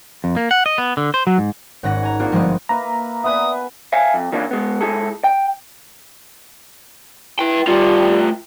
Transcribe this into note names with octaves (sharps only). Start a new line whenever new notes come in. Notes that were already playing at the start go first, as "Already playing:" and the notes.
F2
A#3
F#5
D#5
B3
D3
C5
F#3
G#2
G#1 G#2 C#4 F#5 A#6
G#5 A#5
A#3 C4 D4 F4 F#4 G#4
G1 F3 G#3 B3 C4 D#5
A#3 B4 E5 A#5
B3 B4 D5 E5 G#5 D#6
E5 F5 G#5
F2
E3 A#3 C#4 D4 E4 F4
G#3 B3
G#3 E4 G#4 A4
G5
E4 B4 G5
G3 A3 F4